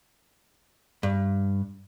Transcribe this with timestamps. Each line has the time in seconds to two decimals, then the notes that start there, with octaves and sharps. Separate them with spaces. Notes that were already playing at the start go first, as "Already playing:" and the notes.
1.03 G2